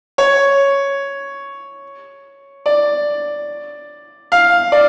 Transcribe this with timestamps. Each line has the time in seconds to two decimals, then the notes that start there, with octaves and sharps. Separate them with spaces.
0.18 C#5
2.66 D5
4.32 F5
4.72 D5